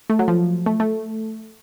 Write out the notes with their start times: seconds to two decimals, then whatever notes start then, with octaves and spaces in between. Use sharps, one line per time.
0.10 A3
0.19 F#3
0.28 F3
0.66 A3
0.80 A3